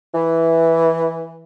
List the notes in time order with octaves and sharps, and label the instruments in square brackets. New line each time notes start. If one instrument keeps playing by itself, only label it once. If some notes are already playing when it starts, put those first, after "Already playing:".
[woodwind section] E3